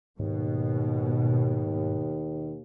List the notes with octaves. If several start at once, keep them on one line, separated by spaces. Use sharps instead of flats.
D#2 G#2 B2